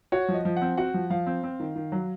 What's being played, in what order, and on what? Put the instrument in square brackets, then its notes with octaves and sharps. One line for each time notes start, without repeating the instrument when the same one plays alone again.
[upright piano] F#4 [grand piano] C#5
[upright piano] F3
[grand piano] D#5
[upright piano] F3
[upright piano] C4 [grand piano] F#5
[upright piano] F#4 [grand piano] F#5
[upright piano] F3
[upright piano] F3 [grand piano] F5
[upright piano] C4
C4
D#3
D#3
F#3